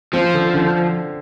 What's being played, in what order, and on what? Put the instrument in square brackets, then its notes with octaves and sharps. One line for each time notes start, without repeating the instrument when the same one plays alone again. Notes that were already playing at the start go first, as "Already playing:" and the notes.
[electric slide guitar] F3 [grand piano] C4
[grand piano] D3
D3